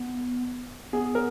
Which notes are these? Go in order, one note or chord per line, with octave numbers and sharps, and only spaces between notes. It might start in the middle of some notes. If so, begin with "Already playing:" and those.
Already playing: B3
B3 G#4
A#4